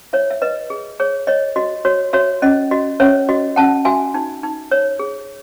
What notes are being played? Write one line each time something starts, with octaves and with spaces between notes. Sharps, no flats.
E4 C#5 E5
E5
B4 D#5
G#4
G#4 C#5
C#5 D#5
F#4 D#5
F#4 C#5
F#4 C#5 E5
C#4 D#5
F#4 D#5
C#4 C#5 E5
F#4 D#5
C#4 F#5 A5
F#4 E5 G#5
D#4
D#4
C#5
G#4